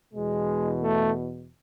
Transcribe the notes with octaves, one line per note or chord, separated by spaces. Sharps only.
E2 B2 G#3
A3